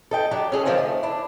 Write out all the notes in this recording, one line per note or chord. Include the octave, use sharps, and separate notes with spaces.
A4 D#5 G5
F#3 D4 G4
C#4 G#4 A4
D3 D#3 F3 G#3 C4
A3
D4 E4